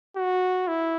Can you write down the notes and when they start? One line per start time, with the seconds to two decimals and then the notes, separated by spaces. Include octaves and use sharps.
0.16 F#4
0.68 E4